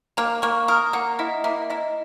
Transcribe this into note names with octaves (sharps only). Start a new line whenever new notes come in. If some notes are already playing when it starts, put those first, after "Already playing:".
A#3 A#5
A#3 C#6
A#4 D#6
A#3 F#5
E4 D#5
A#3 E5
E4 D#5